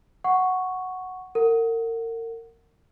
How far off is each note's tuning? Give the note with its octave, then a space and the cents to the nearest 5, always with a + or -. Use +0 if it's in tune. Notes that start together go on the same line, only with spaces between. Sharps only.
F#5 +0 C#6 +0
A#4 -35 F#5 +0